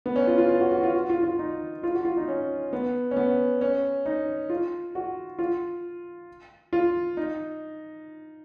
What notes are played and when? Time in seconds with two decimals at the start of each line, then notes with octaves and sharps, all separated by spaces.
0.06 B3
0.16 C#4
0.27 F4
0.38 F4
0.49 F4
0.61 F#4
0.72 F#4
0.83 F4
0.95 F#4
1.10 F4
1.23 F4
1.39 D#4
1.83 F4
1.94 F#4
2.05 F4
2.17 D#4
2.28 C#4
2.73 B3
3.11 C#4
3.17 B3
3.61 C#4
4.06 D#4
4.50 F4
4.95 F#4
5.39 F4
6.73 F4
7.17 D#4